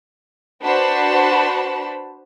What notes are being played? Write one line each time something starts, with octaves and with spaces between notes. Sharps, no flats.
D4 F#4 B4 C5 A5 B5